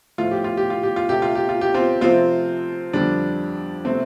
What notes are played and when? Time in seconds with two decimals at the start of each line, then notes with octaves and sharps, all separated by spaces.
0.18 A2 F3 A3 F4
0.31 G4
0.44 F4
0.57 G4
0.70 F4
0.83 G4
0.96 F4
1.09 C3 A3 G4
1.22 F4
1.35 G4
1.49 F4
1.61 G4
1.74 C4 F4
2.01 C3 F3 A3 C4 F4
2.93 F2 D3 G3 D4
3.85 C3 A3 C4